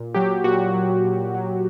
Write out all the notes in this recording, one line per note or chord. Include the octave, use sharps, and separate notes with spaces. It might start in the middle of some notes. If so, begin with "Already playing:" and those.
Already playing: A#2
F#3 G4
A#2 F#4
F#3
A#2
F#3